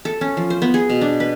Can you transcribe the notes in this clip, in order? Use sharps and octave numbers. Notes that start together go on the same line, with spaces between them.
A4
C#4
F3
C5
B3
G#4
B2
D4
B4